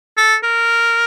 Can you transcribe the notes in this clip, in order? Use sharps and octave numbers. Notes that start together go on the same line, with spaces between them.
A4
A#4